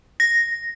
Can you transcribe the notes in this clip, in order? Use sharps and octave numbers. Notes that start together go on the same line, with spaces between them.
A#6